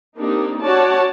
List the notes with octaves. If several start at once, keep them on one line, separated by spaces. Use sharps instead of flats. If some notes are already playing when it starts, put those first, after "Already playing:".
A#3 C4 D4 D#4 G4
C#4 F#4 C#5 D5 A5